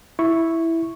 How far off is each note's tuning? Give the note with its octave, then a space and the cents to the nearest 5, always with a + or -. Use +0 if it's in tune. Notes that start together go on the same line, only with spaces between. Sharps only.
E4 +0 C#6 +0